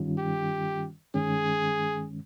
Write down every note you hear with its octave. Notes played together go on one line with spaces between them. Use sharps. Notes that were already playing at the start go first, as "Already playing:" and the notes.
Already playing: G2 D#3 G3 C#4 F4
G4
G2 D#3 G#3 C#4 G#4